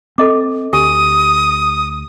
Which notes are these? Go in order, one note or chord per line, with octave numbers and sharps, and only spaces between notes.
C4 A4 D#5 D6
D2 G4 G#5 C#6 D#6